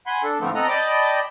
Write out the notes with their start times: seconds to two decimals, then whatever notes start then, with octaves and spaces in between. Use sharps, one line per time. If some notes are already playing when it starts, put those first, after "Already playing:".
0.07 F#5 G#5 B5 C6
0.23 D4 A4
0.40 A2 D3 F3 A3 B3 C4
0.55 C4 A4 D#5 F#5 A#5
0.68 D5 D#5 G5 A5 B5 D6